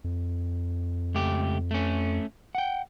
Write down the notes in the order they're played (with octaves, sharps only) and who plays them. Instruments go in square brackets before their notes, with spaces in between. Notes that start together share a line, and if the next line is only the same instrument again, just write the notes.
[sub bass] F2
[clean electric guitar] C#2 A3 G4
A3 C#4
F#5 G5